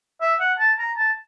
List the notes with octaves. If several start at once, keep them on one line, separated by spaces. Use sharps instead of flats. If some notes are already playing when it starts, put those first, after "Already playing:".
E5
F#5
A5
A#5
A5